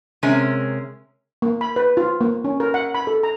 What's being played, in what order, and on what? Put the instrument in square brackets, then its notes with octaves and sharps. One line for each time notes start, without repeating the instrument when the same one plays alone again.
[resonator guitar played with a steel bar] C3 G#3 C#4 A#4
[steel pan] A#3
B5
B4
F4
A#3
C#4
A#4
F#5
B5
A4
A#5